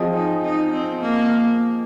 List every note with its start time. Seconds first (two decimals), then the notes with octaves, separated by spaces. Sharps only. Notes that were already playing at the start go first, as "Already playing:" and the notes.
Already playing: F3 C4 G#4 D#5
0.13 D#4
0.43 D#4
0.72 C4
1.01 A#3